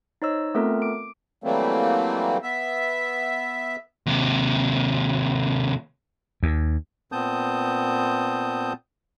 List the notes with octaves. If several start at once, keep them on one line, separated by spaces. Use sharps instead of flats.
D#4 C5 C#5 D#5 E6
A3 B3 C4 F4 A4 A#4
D6 D7
E3 F#3 G3 A3 A#3 C4
B3 E5
D#2 C3
D#2
A#2 B3 C4 A5 D#6 G6